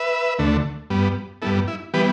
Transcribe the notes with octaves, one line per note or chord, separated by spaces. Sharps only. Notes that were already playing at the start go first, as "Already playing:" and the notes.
Already playing: B4 E5
D2 D3 A3
G2 G3 B3
G2 G3 B3 E4 A4
E4
E3 G3 B3 G4 B4